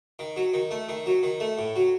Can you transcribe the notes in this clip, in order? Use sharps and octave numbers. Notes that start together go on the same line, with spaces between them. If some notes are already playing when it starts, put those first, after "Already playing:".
D#3
F#3
D#3
A3
D#3
F#3
D#3
A3
A2
F#3